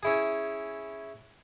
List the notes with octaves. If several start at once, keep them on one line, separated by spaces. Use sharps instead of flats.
C#4 E4 G#4